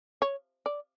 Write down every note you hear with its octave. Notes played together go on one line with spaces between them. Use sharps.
C#5
D5